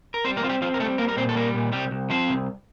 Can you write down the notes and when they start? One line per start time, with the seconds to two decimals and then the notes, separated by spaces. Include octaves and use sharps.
0.14 A#4
0.25 G3 C4 C5
0.37 A#3 A#4
0.43 C4 F4
0.49 G3 G4
0.62 F3 C4 F4
0.74 A#4
0.80 G3 A3 A4
0.98 G3 A#3 A#4
1.09 A#4
1.17 A#2 C4 C5
1.29 A4
1.35 G3 A#3 A#4
1.54 A#2
1.72 C2 G3 G4
1.91 C2
2.10 F3 C4 C5
2.29 C2